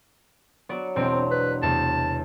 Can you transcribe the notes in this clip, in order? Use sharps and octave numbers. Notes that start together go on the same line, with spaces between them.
F#3 B3 D5 C#6
E1 D3 C4 C5 G5 A#5
B4
E2 C3 A3 A5